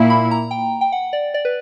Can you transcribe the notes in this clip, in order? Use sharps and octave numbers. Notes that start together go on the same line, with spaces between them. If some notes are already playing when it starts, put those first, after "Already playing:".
Already playing: A#2 A#3 E4
B5
A#5
G5
G5
F#5
D5
D5
B4